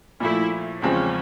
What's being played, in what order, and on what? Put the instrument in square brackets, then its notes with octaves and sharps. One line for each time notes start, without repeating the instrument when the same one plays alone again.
[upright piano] A#2 F3 A3 [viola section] E4
[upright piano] E2 C#3 F3 G#3 C4 [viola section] C#4